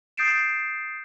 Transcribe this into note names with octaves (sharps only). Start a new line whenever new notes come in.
D#6 G6 A6 C7 D7 E7